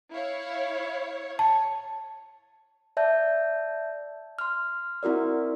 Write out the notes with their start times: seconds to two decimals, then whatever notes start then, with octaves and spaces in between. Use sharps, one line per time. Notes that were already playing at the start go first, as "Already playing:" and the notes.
0.12 E4 C#5 F5
1.39 C#5 A5
2.97 D5 E5 A5 G6
4.39 C6 F6
5.03 C4 E4 F#4 A#4 D5